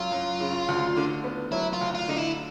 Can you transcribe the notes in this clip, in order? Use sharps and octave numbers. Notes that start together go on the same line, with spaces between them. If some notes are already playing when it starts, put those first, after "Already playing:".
Already playing: F#2 F#3 F4
F#2
C#3
D2
D3
B3
F#3 E4
F4
D2
F4
D3 D#4
E4